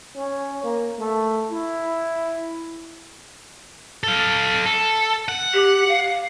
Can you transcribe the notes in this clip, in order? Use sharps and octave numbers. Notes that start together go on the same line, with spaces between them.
C#4
A#3
A3
E4
A4 F5
A4
F#5
G4
F5